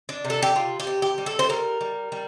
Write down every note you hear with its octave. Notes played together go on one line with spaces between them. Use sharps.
D4
C3
A4
G4
G3 F4
G4
C3
G4
G3
A4
C5
G3 A#4
G3
G3